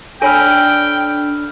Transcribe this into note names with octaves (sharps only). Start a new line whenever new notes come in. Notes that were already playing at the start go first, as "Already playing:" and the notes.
D4 A4 C#5 G5 G#5 B5 F6